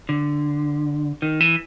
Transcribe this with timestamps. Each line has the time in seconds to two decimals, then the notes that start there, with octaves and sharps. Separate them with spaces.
0.09 D3
1.22 D#3
1.40 E3